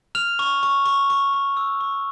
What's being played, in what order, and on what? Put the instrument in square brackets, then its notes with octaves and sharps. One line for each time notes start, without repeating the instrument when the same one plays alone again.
[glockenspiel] F6 F7
C#6
C#6
C#6
C#6
C#6
E6
C#6